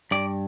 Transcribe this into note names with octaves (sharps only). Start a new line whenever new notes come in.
G2 D5